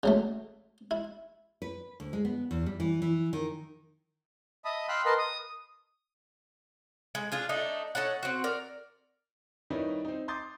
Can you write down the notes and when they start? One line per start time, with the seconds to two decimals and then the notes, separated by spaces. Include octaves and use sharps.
0.03 C#3 F#3 A3
0.91 E4
1.62 B4
2.00 D2
2.13 G#3
2.25 B3
2.51 E2
2.66 G3
2.80 E3
3.02 E3
3.33 D#3
4.65 D#5 E5 A5 B5 D#6
4.88 F5 G5 B5 C6 E6 F#6
5.05 A#4 B4 D#5 A5 C6
5.18 D#6
7.15 G#3
7.32 D4 F4 G#4
7.49 A3 D4 D#4
7.95 D#4 A4 C#5 F#5
8.23 C4 F#4
8.44 A#4 D5
9.70 D#3 G3 D#4 E4 B4 C#5
10.05 C4 D#4
10.28 A#5 C6 D6 D#6 G6 A6